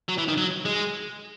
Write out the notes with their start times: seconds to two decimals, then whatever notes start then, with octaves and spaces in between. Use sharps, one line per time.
0.09 F#3
0.18 E3
0.28 D#3
0.37 F#3
0.65 G#3